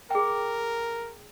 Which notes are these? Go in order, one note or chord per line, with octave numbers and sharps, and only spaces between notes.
G#4 A#4 G5